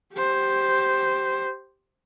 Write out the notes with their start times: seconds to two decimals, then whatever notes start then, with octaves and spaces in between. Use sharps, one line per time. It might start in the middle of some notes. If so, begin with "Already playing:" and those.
0.15 G4 C5